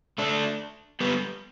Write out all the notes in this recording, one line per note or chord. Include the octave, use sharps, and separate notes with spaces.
A3 D4
G3 B3